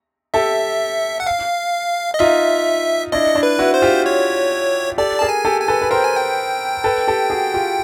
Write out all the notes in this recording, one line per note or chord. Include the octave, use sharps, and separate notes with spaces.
G4 A4 E5
F#5
F5
D#5
D#4 F4 E5
D4 E4 D#5
D4 E4
B4
E4 F#4
C5
F4 G4
C#5
G4 A4 D5
G#4 A#4 A5
G#5
G4 A4
G#5
A4 B4
B4
A#4 C5 G5
G#5
G5
A4 B4
G4 A4
F#4 G#4
F4 G4